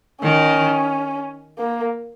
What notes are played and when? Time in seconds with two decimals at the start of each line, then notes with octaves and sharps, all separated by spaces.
0.23 D#3 C#4
1.59 A#3